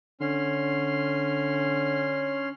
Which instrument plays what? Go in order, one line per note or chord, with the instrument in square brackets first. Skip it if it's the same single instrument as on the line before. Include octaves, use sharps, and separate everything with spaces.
[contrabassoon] D3 [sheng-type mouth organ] C#4 C6 F6